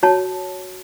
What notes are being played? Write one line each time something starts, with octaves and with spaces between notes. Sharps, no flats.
F#4 C#5 A5